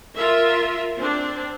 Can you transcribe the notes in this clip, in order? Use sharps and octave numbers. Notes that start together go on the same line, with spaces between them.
F4 A#4 E5
C4 D4